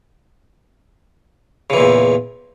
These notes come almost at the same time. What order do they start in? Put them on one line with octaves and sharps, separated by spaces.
C#3 E3 A#2 E2